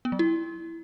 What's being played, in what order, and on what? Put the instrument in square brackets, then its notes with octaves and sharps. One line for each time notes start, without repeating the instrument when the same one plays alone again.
[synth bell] B3
F#3
E4